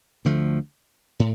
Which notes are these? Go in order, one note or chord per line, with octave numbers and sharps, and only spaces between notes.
D2 D3 F3 A3
A2